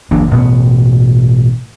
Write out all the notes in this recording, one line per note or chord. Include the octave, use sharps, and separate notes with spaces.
F#1 E3 A#3 D4
A1 B2 B3